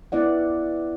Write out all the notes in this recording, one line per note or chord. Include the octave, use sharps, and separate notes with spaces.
B3 E4 D5 F#5